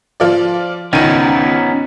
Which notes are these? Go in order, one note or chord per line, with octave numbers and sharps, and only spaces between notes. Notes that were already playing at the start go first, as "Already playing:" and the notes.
F3 F4 D5
C#2 D#3 B3 C#4 D#4 D#7